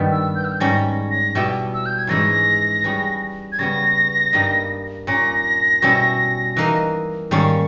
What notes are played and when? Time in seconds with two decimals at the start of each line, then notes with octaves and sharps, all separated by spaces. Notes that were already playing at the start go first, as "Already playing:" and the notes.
Already playing: G2 D#3 G3 B3
0.12 E6
0.35 G6
0.45 E6
0.52 G6
0.60 G#2 G3 C#4 A#6
1.11 A#6
1.35 B2 G3 B3 E4 G4
1.74 E6
1.86 G6
1.98 G#6
2.07 G#2 E3 G#3 C#4 E4 A#6
2.84 G3 C#4 G#4 B4
3.52 G#6
3.59 C#3 G3 B3 A#6
4.33 G2 G3 A#3 D#4
5.07 A#2 A#3 C#4 A#6
5.82 B2 G3 C#4 E4
6.57 E3 A#3 D#4 A#4
7.31 G#2 D#3 G3 A#3 C#4 C#6